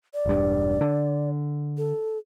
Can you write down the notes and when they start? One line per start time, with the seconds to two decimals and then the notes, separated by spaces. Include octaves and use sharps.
0.14 D5
0.26 E1 G2
0.81 D3
1.77 A4